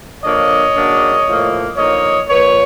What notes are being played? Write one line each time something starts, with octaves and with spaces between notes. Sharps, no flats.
D3 F3 A#3 D4 C#5 D#5
C#3 F#3 A#3 D4
A2 F3 A#3
D3 F3 A#3 D#4 C#5 D#5
A#2 F3 A#3 B4 C#5